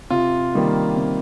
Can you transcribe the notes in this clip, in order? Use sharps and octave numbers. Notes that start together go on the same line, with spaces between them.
C3 F4
D#3 G3 A#3
C3